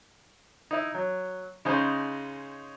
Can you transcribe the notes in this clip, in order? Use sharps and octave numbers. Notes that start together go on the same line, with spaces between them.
D#4 E4
F#3
C#3 G#3 D#4 C5 G#5